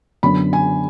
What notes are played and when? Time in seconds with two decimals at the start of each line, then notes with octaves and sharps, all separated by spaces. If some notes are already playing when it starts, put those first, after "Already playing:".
0.23 F#2 D3 F#3 B3 B5
0.53 G#5